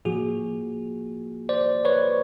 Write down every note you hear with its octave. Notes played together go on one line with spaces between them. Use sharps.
A2 F3 A#3 F#4 G#4
C5 D5
B4 C#5